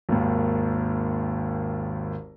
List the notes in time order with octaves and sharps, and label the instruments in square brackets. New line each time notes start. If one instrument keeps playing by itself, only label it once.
[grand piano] G#1 D#2